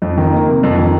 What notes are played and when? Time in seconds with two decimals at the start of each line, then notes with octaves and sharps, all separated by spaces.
0.02 F2
0.18 D#3
0.33 A#3
0.48 C3
0.63 F2
0.78 D#3